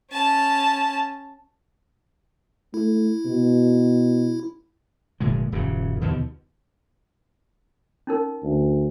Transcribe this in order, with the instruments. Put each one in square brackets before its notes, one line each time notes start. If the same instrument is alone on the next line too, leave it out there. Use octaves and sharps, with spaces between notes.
[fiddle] C#4 A5
[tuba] A3 [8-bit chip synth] E4
[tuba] B2
[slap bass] F1 A#2 D3 G#3
D#1 F#2 C#3
D#2 B2 D3 F3
[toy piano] C#4 D#4 A#4
[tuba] D2